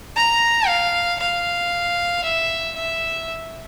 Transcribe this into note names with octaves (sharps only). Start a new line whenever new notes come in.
A#5
F5
F5
E5
E5